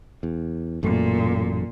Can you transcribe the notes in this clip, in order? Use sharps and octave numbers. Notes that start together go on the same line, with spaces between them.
E2
A1 F#2 A#2 A3